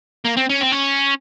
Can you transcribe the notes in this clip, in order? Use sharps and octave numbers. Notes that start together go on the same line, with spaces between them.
A#3
C4
C#4
C4
C#4